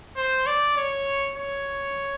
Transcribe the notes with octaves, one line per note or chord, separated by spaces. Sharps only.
C5
D5
C#5
C#5